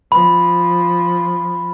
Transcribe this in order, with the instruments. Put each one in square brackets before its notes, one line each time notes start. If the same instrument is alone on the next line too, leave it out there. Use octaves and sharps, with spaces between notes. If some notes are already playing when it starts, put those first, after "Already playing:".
[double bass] F3 [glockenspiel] B5